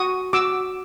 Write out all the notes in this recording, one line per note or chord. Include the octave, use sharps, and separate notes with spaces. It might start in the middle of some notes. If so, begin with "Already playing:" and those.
Already playing: F#4 C#6 D#6
F#4 D6 E6